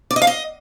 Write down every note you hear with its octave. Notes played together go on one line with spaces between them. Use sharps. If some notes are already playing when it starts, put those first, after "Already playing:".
D5
D#5
F5
D#5